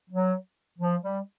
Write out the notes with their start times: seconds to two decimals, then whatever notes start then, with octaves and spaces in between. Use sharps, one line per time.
0.10 F#3
0.79 F3
1.02 G3